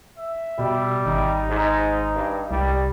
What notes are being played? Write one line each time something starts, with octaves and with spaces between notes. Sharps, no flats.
E5
B2 G3
G#1 D#4
G#2
G2
C2 G3